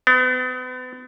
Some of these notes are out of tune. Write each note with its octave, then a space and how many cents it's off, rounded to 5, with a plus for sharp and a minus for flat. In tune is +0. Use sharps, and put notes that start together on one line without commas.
B3 +40